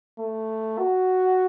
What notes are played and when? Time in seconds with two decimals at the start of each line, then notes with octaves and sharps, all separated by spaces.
0.19 A3
0.78 F#4